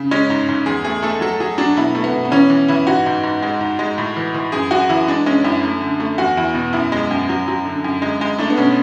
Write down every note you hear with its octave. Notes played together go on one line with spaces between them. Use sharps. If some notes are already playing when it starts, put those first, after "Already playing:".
Already playing: C#3
G#3 C#4
G#2
G#2
E2 G#4
A3 G#4
A3 A4
F#3 A4
F#3 G#4
F#3 D4
B2 E4
A3
B3
B2
B3
E3 C#4
E3
E3 E4
G#2 F#4
G#2
G#2
G#3
G#2
G#3
A2
E3
E3
F#2 G#4
F#2 F#4
E3 E4
G#3 D4
G#3 C#4
F#2 E4
A3
D3
A3
E2 F#4
E2 E4
B2
F#2 E4
G#3
F#2
F#3
F#3
D3
F#2
G#3
G#3
A3 D4
B3
B2 C#4